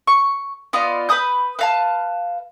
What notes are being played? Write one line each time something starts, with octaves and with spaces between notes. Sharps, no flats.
C#6
B3 F4 D5 D#5
B4 B5 D#6 G6
B4 F5 A5